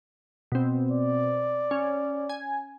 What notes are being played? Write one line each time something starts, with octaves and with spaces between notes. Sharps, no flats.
B2 C4
D5
C#4
G#5